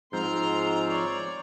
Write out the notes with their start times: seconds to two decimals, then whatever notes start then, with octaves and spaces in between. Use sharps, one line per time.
0.13 G#2 F3 C4 A#5 C6
0.89 C#5 D5 A#5